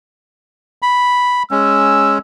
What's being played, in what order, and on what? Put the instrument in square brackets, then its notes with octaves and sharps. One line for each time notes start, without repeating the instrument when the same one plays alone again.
[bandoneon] B5
[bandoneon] G#3 C#4 [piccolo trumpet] E6